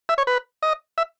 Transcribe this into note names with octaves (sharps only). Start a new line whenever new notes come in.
E5
C#5
B4
D#5
E5